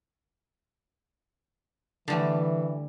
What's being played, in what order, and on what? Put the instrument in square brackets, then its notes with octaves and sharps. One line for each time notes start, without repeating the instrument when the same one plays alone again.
[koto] D3 G3 A3 [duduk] E3